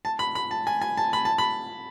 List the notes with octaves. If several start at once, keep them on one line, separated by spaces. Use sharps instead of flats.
A5
B5
B5
A5
G#5
G#5
A5
B5
A5
B5